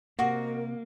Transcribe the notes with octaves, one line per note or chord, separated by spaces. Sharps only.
C3 A#3 F#4 A#4 D#5 F#5